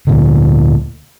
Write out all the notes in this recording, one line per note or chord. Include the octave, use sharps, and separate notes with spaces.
D2 A#2 D3